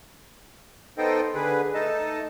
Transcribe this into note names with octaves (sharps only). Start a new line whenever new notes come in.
B3 D#4 A4 C5 D#5 G5
D3 G#4 B4
A3 D#4 A4 D#5 A5